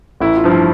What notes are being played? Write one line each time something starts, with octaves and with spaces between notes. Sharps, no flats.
A1 E4
F4
G2 F3
E4